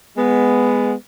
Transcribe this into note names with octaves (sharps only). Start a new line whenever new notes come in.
G#3 B3